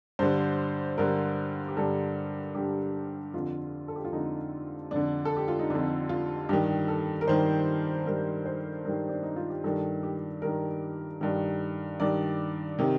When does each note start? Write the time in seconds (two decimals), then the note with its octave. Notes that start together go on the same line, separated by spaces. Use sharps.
0.19 G2 D3 C5
0.98 G2 D3 A#4
1.68 G4
1.77 G2 D3 A4
2.55 G2 D3 G4
3.34 F2 D3 F4
3.88 A4
3.96 G4
4.05 F4
4.12 F2 D3 D#4
4.91 F2 D3 D4
5.25 A4
5.37 G4
5.48 F4
5.59 D#4
5.70 F2 D3 D4
6.09 F4
6.49 G2 D#3 G4
6.88 A4
7.21 A#4
7.28 G2 D#3 C5
8.06 G2 D#3 A#4
8.46 C5
8.85 G2 D#3 A#4
9.09 D4
9.23 D#4
9.36 F4
9.50 G4
9.64 G2 D#3 A4
10.03 G4
10.42 G2 D#3 A#4
11.21 G2 D#3 A#4
12.00 G2 D#3 D5
12.79 C3 D#3